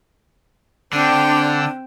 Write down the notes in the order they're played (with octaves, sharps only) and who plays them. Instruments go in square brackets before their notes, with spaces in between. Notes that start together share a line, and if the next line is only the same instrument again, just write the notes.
[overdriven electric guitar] D3 [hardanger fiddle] C4 G5 [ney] D4